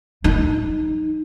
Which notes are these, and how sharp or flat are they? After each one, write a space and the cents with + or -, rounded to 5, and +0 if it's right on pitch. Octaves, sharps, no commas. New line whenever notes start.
F#3 +5 D#4 +0